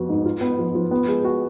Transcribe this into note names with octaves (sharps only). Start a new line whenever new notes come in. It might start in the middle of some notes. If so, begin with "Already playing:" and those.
Already playing: F2 F3 B3 F#4
G#2
F4
B3
F3
F3
B3
G#3
F#4